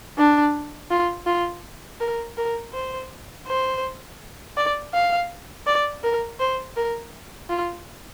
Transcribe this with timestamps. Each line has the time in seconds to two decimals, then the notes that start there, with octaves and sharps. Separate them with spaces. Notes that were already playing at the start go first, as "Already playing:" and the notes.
0.18 D4
0.90 F4
1.26 F4
2.00 A#4
2.37 A#4
2.73 C5
3.47 C5
4.57 D5
4.93 F5
5.66 D5
6.03 A#4
6.39 C5
6.76 A#4
7.50 F4